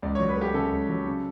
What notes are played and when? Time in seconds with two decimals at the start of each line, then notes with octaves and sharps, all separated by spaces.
0.02 C#2 D5
0.15 F#3 C#5
0.29 B4
0.37 A3 G4
0.54 C#3 A4
0.71 C#2
0.89 F#3
1.06 C#3